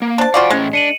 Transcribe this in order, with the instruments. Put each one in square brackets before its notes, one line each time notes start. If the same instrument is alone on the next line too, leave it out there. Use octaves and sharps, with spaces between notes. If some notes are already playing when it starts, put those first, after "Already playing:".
[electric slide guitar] A#3
[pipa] D4 A5 [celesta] C5
[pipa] F4 F#4 D5 [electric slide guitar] F5 G#5
[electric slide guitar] A2 C#4 [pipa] G#3
[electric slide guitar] D4 [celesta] C#7 D#7 F#7